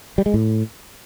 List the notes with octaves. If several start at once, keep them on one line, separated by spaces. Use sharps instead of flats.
G3
G#3
A2